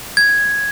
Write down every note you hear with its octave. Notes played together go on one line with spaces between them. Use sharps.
G#6